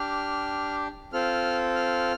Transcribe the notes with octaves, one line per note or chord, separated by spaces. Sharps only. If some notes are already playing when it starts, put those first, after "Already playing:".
Already playing: D4 G4 F6
C4 F4 A4 F6
F6